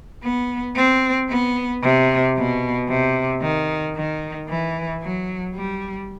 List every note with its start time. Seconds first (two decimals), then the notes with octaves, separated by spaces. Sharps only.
0.23 B3
0.76 C4
1.29 B3
1.83 C3
2.36 B2
2.88 C3
3.42 D#3
3.96 D#3
4.49 E3
5.02 F#3
5.55 G3